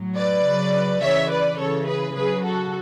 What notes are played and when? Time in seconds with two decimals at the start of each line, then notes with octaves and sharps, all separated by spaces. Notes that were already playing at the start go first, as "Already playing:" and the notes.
Already playing: A2 F#3
0.17 B4 D5
0.46 C#3 F#3
1.02 C#3 E3 C#5 E5
1.31 B4 D5
1.59 C#3 E3 A4 C#5
1.87 G#4 B4
2.15 C#3 F#3 G#4 B4
2.44 F#4 A4